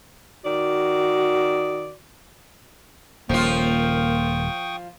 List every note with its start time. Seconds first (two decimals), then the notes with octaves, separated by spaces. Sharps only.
0.45 D#3 F#4 D5
3.29 D#1 F3 A#3 F4 G5 C#6 D#6